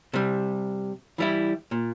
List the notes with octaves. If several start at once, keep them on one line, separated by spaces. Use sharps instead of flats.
C3 G3
E3 G3 E4
A#2